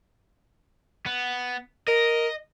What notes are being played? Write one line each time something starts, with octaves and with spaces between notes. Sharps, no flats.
B3
A#4 D#5